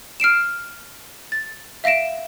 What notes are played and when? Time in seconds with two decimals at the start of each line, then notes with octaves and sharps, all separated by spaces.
0.20 F6 C7 D7 E7
1.32 A6
1.84 E5 F5 A#6 D7 E7